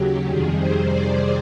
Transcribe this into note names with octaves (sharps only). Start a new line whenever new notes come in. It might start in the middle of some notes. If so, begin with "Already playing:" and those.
Already playing: D#2 C#3 F#3 F#4 G4
F2 C3 D#3 G3 G#4
C5
D5